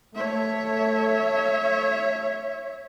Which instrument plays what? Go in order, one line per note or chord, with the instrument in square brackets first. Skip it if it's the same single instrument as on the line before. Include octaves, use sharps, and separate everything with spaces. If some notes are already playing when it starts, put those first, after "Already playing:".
[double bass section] A3 [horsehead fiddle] C#5 E5